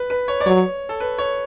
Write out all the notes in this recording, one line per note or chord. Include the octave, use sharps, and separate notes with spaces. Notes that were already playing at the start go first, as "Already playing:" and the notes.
Already playing: B4
B4
C#5
D5
F#3 C#5
A4
B4
C#5